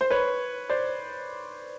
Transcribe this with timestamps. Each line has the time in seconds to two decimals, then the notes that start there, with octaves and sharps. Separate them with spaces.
0.01 C5
0.10 B4 C#5
0.70 C5 D5